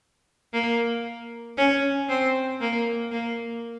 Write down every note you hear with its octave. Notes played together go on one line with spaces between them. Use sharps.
A#3
C#4
C4
A#3
A#3